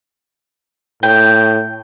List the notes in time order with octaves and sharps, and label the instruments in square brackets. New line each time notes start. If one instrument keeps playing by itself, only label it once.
[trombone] A2 [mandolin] G5